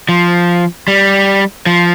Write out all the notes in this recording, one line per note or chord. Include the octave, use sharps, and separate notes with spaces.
F3
G3
F3